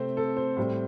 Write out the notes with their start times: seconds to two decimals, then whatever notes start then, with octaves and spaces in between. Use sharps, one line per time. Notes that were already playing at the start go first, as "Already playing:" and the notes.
Already playing: C3 A3 C4 C5
0.17 A4
0.37 C5
0.57 A2 G3 C4